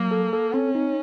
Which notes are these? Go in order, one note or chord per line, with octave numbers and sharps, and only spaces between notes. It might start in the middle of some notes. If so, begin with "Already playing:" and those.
Already playing: F#3 A#3
A4
A4
C4 C#4
D#4